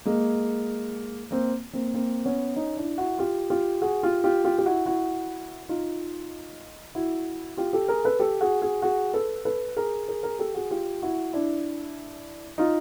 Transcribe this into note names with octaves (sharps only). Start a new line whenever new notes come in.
G#3 A#3
A#3 C4
A#3 C4
A#3 C4
B3 C#4
C#4 D#4
D4 E4
E4 F#4
F4 G4
F4 G4
F#4 G#4
F4 G4
F4 G4
F4 G4
G4
E4 F#4
E4 F#4
D#4 F4
E4 F#4
F4 G4
G4 A4
G#4 A#4
A4 B4
G4 A4
F#4 G#4
F#4 G#4
F#4 G#4
A4 B4
A4 B4
G#4 A#4
G#4 A#4
G#4 A#4
G4 A4
F#4 G#4
F4 G4
E4 F#4
D4 E4
D#4 F4